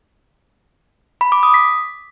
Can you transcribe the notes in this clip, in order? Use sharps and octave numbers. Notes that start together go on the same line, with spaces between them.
B5
D6
D#6
B6